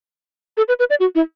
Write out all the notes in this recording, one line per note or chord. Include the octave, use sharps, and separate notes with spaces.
A4
B4
B4
D5
F#4
E4